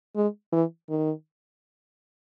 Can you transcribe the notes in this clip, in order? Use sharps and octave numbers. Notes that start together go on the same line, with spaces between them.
G#3
E3
D#3